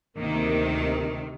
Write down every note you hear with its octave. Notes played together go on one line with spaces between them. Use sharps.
D2 C3 D#3 A#3